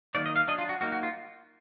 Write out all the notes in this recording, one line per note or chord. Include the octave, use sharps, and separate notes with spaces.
D#3 F#3 A#3 D#4 D5
D#5
F5
F#3 D4 D#5
F4
F#4
F#3 A#3 D#4 F#4
F#4
F4